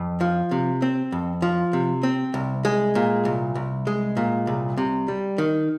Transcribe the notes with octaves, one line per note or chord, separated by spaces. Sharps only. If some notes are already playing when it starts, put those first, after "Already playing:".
Already playing: F2
F3
C3
C4
F2
F3
C3
C4
C2
G#3
A#2
C2
C2
G#3
A#2
C2
C3
G3
D#3